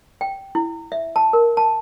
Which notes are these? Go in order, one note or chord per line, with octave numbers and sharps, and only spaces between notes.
G5
E4
E5
A5
A#4
A5